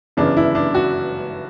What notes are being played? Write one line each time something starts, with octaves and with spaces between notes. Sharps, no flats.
G1 F#2 C#3 E3 D4
E4
D4
F#4